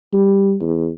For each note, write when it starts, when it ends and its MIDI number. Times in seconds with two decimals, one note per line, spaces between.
0.13 0.55 55
0.61 0.89 40